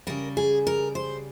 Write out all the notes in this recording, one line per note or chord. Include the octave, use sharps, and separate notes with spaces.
C#3 G3 A#4
G#4
A#4
C5